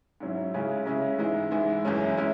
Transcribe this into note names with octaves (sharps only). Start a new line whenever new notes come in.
G#2 F#3 C#4 E4
C#3 G#3 C#4 E4
C#3 G#3 C#4 E4
G#2 E3 G#3 E4
G#2 E3 G#3 E4
F#2 E3 G#3 C#4 E4
E3 G#3 C#4 E4